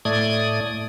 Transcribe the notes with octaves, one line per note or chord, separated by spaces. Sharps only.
A2 A3 D5 D#6 G#6